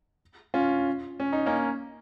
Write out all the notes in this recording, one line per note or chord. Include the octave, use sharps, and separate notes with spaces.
C#4 F4
C#4
D#4
A#3 C#4